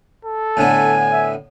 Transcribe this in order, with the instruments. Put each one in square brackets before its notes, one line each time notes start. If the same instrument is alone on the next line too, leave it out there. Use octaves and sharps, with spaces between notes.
[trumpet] A4
[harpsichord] A2 D3 B3 [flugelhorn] G#5
[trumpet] E5